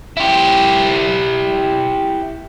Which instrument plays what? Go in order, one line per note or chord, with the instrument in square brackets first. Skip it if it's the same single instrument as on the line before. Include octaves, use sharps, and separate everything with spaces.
[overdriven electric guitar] E4 G4